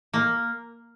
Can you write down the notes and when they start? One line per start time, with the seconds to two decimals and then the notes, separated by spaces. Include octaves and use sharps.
0.13 A#3